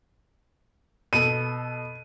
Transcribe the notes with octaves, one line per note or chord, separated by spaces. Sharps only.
B2 A4 D#7